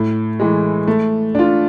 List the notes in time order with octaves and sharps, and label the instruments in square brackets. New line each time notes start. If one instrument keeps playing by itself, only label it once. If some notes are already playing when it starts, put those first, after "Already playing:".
Already playing: [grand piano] A2
E3 G#3
A3
D4 F4